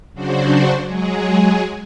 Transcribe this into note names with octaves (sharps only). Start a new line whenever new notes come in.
C#3 F#3 D4 F#4 C5
F#3 G#3 G#4